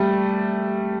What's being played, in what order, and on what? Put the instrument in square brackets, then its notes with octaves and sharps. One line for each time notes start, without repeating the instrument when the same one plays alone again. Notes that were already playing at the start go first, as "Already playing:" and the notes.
Already playing: [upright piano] G3 A3